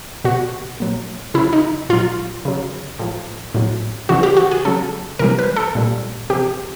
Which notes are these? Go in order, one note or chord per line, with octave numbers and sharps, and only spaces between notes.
B2 G3 F#4
A#2 F#3
C#3 F#3 E4
D#4
A#2 F#3 F4
C#3 F#3
A2 F3
A2 F#3
C#3 E3 G3 F#4
G4
F#4
G#4
C#3 F#3 A4
C3 E3 G3 A#4
B4
A4
A#2 G3
C3 F3 G4